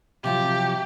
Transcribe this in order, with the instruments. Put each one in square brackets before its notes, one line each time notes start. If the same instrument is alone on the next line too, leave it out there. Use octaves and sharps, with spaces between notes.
[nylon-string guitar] C3 F3 F#3 [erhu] G4